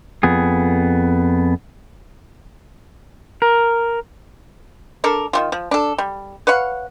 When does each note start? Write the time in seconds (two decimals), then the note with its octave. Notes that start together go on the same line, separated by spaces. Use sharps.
0.23 F2 B3 G#4
3.42 A#4
5.04 D4 A4 A#4
5.33 D#3 G3 F4
5.52 F3
5.71 D4 A4
5.98 G3
6.47 B4 C#5 F5 F#5